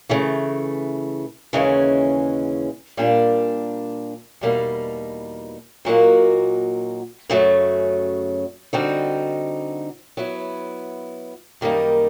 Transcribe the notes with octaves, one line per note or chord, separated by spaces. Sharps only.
C#3 E3 A3
D#2 C#3 E3 G#3 C#4
A#2 G3 A#3 D4
E2 B2 G3 A#3 D#4
A#2 F#3 A#3 D#4 F#4
F#2 C#3 F#3 A3
D3 G3 C4 D#4 F#4
F#3 B3 E4
F#2 D#3 G3 A#3 D#4